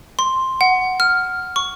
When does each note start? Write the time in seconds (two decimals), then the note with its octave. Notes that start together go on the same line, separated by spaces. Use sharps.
0.19 C6
0.61 F#5
1.00 F6
1.56 C#6